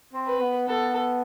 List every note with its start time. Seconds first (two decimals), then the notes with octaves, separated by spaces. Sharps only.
0.13 C4
0.26 B4
0.40 B3
0.67 B3 A4